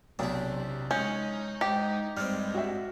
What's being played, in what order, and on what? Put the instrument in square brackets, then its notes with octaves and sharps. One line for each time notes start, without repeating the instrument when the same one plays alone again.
[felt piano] B1 [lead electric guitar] C3 [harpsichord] D4 E4
[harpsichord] G#3 [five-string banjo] C#4 [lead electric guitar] D#4 D#5 [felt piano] G6
[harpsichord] G#2 [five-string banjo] G4
[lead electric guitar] G2 [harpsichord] G3 G#3 C4 [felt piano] F6
[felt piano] F#4 E5